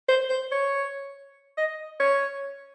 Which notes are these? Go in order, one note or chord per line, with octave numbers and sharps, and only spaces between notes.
C5
C5
C#5
D#5
C#5